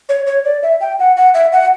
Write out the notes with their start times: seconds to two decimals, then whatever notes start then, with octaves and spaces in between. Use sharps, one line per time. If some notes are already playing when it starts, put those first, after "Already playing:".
0.09 C#5
0.27 C#5
0.45 D5
0.63 E5
0.81 G5
0.99 F#5
1.17 F#5
1.34 E5
1.53 F#5